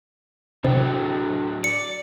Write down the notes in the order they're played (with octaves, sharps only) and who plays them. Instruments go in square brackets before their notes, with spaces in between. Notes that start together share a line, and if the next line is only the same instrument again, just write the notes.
[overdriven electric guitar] A2 F#3 [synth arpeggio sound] C3 [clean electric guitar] D4 A4 G5
[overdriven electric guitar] D5 [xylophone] C#7